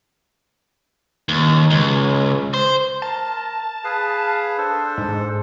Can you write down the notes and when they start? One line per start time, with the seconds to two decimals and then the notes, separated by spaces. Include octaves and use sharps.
1.29 D#2
1.71 C#2
2.54 C5
3.02 A#4 A5 A#5
3.84 G#4 B4 F5
4.58 D4 A4 C5
4.97 G#2